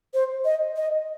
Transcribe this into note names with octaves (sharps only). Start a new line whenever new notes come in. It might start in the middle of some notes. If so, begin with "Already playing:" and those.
C5
D#5
D#5